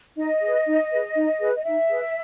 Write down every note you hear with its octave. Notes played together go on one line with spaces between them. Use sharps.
D#4 D#5
G#4 B4
D#4
G#4 B4
D#4
G#4 B4
D#5
D#4 E5
G#4 B4